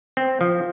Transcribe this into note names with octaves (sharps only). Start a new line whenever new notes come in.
C4
F3